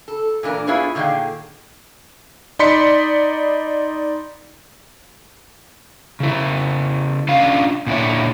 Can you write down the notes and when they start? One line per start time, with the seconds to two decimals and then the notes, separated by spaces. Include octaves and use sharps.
0.08 A4
0.43 A#2 E3 D4 A#4
0.67 B3 E4 F4 G#4 B4 C#5
0.95 A#2 D3 D#3 G#4 F5 G5
2.59 D#4 D5 B5 C6 B6 C#7
6.20 C#3 E4
7.28 C#4 D4 F4 F5
7.87 A#2 D4 E4 C#5